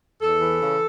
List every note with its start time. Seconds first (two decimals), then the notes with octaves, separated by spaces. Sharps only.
0.21 E2 A4
0.41 E3
0.61 C#3